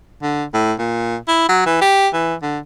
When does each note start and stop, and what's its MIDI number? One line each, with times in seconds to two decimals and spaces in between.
0.22 0.44 50
0.54 0.73 45
0.79 1.16 46
1.28 1.48 64
1.49 1.61 54
1.66 1.79 52
1.82 2.08 67
2.13 2.35 52
2.42 2.59 50